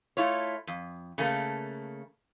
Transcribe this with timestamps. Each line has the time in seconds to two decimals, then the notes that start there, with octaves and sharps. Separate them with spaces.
0.17 A3 E4 F4 C#5
0.67 F2
1.18 C#3 A3 A#3